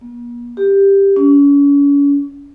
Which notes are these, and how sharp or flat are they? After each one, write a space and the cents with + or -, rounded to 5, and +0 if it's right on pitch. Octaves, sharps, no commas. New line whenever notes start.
A#3 +45
G4 +10
C#4 +40